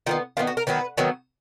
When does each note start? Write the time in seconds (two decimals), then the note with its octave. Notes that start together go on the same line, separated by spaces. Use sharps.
0.06 D#3 G#3 B3 F4
0.37 D#3 G#3 B3 F4
0.47 F#4
0.57 A#4
0.67 D#3 F#3 B3 B4
0.98 D#3 F#3 B3